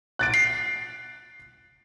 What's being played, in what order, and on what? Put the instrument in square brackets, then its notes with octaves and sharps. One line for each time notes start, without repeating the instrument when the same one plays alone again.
[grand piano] F#6 A6 D7
[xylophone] C7